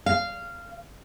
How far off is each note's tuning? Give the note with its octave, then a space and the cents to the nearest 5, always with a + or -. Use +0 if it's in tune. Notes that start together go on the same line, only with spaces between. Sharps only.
F5 -15